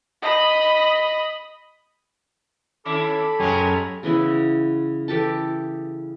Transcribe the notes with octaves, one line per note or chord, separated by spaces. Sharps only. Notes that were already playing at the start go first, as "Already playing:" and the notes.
D#5 B5
D#3 C#4 E4 A4 B5 D6
F#2 G#3 B3 G4 A#4 C#5 G#5
C#3 E3 B3 E4
E3 G4 A4 A5